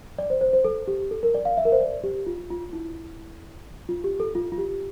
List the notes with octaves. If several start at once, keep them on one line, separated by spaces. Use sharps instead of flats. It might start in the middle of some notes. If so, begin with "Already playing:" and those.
D5
C5
C5
C5
A4
G4
A4
A#4
D5
F5
E5
A#4
C5
D5
G4
F4
F4
E4
F4
G4
A4
F4
F4
G4